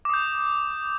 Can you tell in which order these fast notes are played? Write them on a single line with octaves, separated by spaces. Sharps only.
D6 D#6 G6